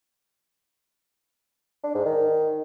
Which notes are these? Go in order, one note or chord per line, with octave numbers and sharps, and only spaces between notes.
D4
G#2
D#3